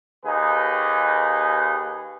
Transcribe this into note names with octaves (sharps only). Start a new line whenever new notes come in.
D#2 D#4 G#4 B4